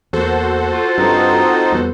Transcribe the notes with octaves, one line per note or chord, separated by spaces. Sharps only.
E2 A#3 F#4 A4 C5
F4
G2 G3 C4 D#4
E2 G3 B3